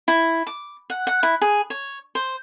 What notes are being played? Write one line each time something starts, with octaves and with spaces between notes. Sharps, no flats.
E4
D6
F#5
F#5
E4
G#4
C#5
C5